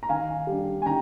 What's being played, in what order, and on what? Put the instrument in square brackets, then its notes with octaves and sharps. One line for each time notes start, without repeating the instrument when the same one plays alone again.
[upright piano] A#5
D#3 F5 G#5
G3
D4
G#5
D#3 G5 A#5